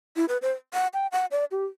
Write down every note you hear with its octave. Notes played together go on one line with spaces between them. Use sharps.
E4
B4
C5
F#5
G5
F#5
D5
G4